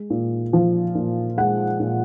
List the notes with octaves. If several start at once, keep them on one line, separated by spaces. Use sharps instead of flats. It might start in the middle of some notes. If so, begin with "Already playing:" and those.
Already playing: G#3
A#2
F3
A#2
G#3 F#5
A#2